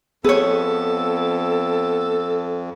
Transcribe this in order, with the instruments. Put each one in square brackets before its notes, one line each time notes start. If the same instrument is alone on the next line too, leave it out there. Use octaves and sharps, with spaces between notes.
[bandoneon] F2 [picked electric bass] B3 [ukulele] G#4 C#5 [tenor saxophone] A4